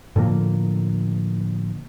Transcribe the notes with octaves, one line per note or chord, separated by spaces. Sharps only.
A2 D3 F3 A#3